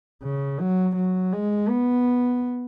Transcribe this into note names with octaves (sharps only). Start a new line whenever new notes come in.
C#3
F#3
F#3
G#3
B3